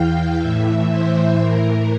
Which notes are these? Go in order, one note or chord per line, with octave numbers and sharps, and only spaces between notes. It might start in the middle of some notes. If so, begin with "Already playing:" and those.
Already playing: E2 E3 F5 G5
A2 E3 E5
C5
A2 E3 A#4